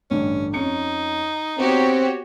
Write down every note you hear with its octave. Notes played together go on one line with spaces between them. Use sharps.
A1 G2 D3 C#4
F2 C#4 D#4 C#7
B3 C4 F#4 G4 C#5